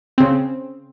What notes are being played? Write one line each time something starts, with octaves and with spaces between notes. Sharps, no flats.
C#3 C4